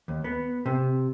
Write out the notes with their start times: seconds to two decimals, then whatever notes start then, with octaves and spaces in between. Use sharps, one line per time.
0.08 D#2
0.24 B3
0.66 C3